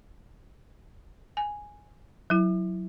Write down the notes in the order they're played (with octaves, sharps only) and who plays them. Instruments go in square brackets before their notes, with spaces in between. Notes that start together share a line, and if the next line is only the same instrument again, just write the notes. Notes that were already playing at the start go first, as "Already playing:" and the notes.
[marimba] G#5
F#3 E4